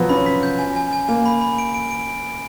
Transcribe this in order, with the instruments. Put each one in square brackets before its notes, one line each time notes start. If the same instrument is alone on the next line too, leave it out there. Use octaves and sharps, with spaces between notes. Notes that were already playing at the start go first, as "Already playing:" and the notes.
Already playing: [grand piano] F3 F#3 B3
[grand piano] C#4 [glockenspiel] B5
[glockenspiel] B6
G6
G#5
G#5
G#5
[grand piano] A#3 [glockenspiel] G#5
[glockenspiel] B5
B5
D7
D7
D7